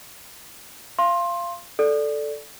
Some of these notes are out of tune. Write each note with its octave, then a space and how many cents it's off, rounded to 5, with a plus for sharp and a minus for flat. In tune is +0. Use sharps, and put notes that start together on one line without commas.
F5 -20 C6 +20
A4 -5 D5 +0